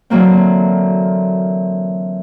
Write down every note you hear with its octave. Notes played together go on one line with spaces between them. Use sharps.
D3 E3 F#3 A#3 C4